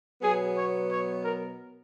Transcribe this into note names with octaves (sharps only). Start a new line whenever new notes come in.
B2 F#3 B3 G#4
C#5
C#5
A#4